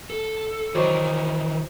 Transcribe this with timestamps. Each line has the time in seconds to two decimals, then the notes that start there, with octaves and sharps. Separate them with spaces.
0.10 A4
0.75 D#3 E3 F#3 C5 D5 D#5